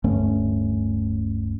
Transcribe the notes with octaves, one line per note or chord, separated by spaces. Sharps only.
D1 G2 A3 C#4